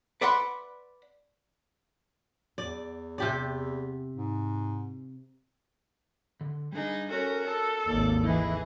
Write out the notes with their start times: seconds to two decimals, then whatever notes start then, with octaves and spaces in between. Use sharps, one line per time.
0.21 B4 D5 E5 F#5 B5 C6
2.58 E2 D5
3.18 C3 G4 D5
4.16 G#2
6.41 D3
6.73 G3 D4 D#4 G#4
7.10 C#4 F#4 A4 A#4
7.48 A4 A5
7.88 G#1 D#2 D5
8.24 E3 D#4 E4 G#4 D#5 F5